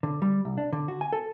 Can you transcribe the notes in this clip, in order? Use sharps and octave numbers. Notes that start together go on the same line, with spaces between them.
D3
G3
C2
D4
D3
F#4
G#5
A4